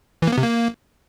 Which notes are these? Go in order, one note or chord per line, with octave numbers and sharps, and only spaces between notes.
E3
A#3
B3
C3
A#3